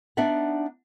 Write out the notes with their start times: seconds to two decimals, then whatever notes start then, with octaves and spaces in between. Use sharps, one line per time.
0.17 B3 D4 D#4 D5 E5 F#5